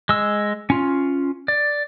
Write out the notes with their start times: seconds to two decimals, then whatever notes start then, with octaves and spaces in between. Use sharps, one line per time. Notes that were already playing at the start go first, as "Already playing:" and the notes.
0.09 G#3 E6
0.70 C#4 F4
1.48 D5